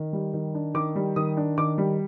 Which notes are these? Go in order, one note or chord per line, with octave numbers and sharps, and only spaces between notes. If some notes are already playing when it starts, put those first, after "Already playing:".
Already playing: D#3
G3
D#3
D4
D#3 D6
G3
D#3 D#6
D4
D#3 D6
G3